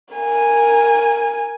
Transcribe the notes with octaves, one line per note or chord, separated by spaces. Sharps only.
A#4 G#5